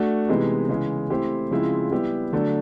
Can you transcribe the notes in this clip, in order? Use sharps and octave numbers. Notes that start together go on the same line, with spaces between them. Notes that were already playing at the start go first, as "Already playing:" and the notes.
Already playing: A3 D4 F#4
C3 E3 G#3 B3 D#4
C#3 E3 G#3
A3 C4 E4 G4 C5
C#3 F3 G#3 C4 E4
G3 B3 E4 G4
D3 F#3 A3 D4